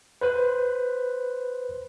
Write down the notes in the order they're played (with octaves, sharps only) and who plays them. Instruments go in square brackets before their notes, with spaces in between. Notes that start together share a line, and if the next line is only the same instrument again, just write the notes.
[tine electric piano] B4 C5 F#6